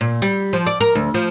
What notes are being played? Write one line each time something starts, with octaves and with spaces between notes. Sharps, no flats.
A#2
G3
F3
D5
A#4
D2
F3